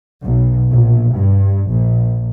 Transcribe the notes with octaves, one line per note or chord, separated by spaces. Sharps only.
B1
A#1
G2
A#1